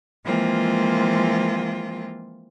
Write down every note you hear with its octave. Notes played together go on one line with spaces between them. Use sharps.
E3 F3 G#3 A#3 C4 F4